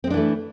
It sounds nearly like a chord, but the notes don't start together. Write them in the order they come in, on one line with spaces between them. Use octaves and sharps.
C4 G#3 D4 E3 A3